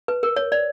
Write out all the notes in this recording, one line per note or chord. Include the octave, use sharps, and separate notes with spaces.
B4
A#4
C#5
D5